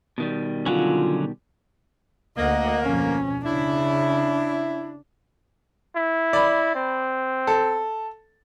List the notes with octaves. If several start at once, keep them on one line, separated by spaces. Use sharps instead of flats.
B2 D#3 G3
D3 F#3 C#4 F4
D2 A#3 D#5 F#5
F2 B2 C#4
C#3 D4 E4
E4
D5 B5
C4
A4